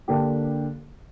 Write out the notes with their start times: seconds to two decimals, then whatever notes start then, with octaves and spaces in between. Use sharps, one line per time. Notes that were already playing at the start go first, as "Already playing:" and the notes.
0.08 D3 A#3 D4 G4